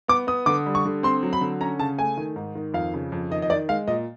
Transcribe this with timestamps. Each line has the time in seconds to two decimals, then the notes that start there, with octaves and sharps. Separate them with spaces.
0.08 B3 D6
0.27 B3 D#6
0.46 D3 D6
0.66 G3
0.75 C#6
0.85 D3
1.03 C4 C6
1.23 F#3
1.33 B5
1.41 D3
1.61 C#4 A#5
1.79 C#3 A5
1.99 A3 G#5
2.17 D#3
2.36 G#2
2.55 D#3
2.74 F2 F5
2.94 C#3
3.12 F2
3.31 D#3 D#5
3.42 D#5
3.50 D#3 D5
3.69 G#3 F5
3.88 A#2 D#5